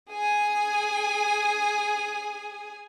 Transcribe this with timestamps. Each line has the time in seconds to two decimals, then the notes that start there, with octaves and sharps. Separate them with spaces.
0.11 G#4 G#5